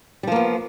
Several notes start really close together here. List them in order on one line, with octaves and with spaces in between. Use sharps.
G3 F3 A#3 B3